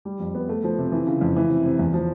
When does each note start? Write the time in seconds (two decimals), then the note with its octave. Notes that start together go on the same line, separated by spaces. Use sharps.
0.05 G3
0.20 F2
0.35 B3
0.49 A3
0.64 F3
0.79 C3
0.92 E3
1.07 C#3
1.21 F2
1.36 E3
1.50 C3
1.65 C3
1.79 E2
1.93 F3